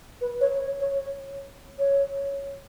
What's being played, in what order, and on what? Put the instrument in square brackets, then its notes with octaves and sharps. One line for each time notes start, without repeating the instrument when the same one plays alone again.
[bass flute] B4
C#5
C#5
C#5